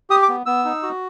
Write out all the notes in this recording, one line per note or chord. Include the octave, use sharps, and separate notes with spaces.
G4 D#6
D6
B3
B3 E6
D#4
F#4